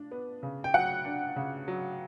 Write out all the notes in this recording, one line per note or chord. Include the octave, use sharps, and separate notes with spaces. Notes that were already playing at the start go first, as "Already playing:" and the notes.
Already playing: D4
B3
C#3
G5
F#3 F#5
D4
C#3
F#3